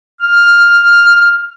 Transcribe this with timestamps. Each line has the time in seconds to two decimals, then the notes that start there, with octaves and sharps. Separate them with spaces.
0.22 F6